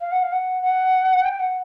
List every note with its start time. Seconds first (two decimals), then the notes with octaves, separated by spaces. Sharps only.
0.01 F5
0.12 F#5
0.22 F5
0.32 F#5
0.63 F#5
1.25 G5
1.40 F#5